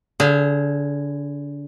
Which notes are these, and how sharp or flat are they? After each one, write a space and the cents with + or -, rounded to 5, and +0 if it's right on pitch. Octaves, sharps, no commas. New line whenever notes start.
D3 -30 G#4 +0 F5 +0